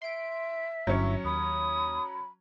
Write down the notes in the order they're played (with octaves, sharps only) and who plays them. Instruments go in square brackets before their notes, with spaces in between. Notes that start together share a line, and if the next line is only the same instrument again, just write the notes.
[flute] E5 [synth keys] C6 D7
[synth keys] G1 E4 C#6 [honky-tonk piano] F#3 C#4
[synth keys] D#2 [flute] B5 [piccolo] D#6